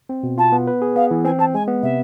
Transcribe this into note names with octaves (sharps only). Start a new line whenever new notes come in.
C4
B2
F4 A5
B3
B4
G#4
B3 F5
E3
C4 G#5
C4 A5
G#3 G#5
B3
C3 E5